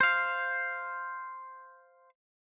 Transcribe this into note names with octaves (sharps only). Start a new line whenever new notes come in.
C5 F5